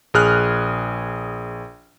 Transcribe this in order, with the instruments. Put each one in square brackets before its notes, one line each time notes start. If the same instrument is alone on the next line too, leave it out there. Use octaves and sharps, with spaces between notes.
[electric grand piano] A#1 G#4 F6 F#6